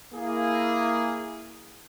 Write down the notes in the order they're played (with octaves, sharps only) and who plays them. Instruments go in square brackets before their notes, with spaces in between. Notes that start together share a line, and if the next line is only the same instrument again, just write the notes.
[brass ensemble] A#3 E4 G#4